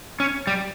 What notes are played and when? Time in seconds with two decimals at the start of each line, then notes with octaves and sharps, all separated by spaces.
0.20 C#4
0.47 G3